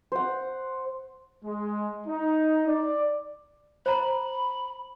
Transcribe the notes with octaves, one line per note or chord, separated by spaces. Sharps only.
C5 F#5
G#3
D#4
D5
C5 A#5 B5